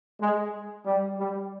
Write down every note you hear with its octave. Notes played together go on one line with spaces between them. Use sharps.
G#3
G3
G3